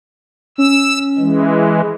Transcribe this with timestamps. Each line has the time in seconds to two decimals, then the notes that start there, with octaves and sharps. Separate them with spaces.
0.58 C#4 E6
1.19 E3 G#3